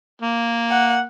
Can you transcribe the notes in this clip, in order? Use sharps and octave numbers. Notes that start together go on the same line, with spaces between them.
A#3
F#5